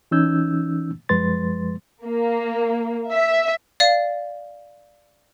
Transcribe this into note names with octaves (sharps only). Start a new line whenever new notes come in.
E3 C#4 D#4 E6 G6 G#6
F#2 F3 G#3 B4 C6 A6
A#3
E5
D5 F5